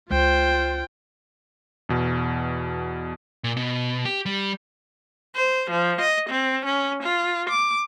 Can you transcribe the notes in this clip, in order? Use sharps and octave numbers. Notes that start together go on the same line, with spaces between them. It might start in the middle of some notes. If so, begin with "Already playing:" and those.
C#2 G#3 F4 C5 G5
E2 B2
A#2
B2
G4
G3
C5
F3
D#5
C4
C#4
F4
D6